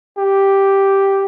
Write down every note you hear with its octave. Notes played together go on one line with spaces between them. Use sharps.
G4